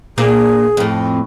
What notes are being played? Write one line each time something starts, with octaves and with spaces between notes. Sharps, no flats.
A#2 A#3 D4 G#4
F2 A2